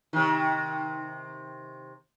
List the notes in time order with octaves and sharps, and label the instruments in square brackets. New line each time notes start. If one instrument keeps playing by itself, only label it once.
[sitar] C3 D#3